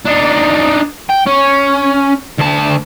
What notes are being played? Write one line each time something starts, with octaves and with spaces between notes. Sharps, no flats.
D4 D#4
G5
C#4
D2 A5